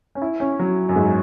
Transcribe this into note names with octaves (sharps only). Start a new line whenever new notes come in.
C#4
E4
C#4
F#3
F#2
G#2